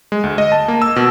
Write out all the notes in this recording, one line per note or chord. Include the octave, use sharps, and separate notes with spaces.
G#3
D2
D#5
A5
A#3
E6
B2